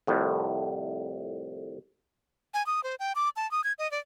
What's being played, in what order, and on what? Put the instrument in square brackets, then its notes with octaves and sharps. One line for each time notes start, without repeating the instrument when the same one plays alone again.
[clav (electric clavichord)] C2 F2 A2
[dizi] G#5
D#6
C5
G5
D6
A5
D#6
G#6
D#5
D5